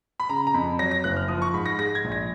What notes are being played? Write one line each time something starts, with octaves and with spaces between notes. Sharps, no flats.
B5
C#3 A#5
A#5
F2 B5
F#3 A#6
A#6
F#1 F#6
F6
F3 D#6
C#6
G#2 B5
A#6
G#3 A#6
G#6
A#1
A#6